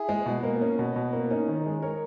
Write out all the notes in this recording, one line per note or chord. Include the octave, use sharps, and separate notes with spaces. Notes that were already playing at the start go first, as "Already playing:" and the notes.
Already playing: E4 G#4
G#3
B2
A#3
C#4
B2
B2
A#3
C#4 D#4
D#3
G#3
A#4 C#5